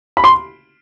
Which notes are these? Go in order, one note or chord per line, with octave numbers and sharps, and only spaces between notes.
B5
C6